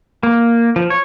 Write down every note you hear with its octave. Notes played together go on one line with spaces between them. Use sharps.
A#3
F3
C#5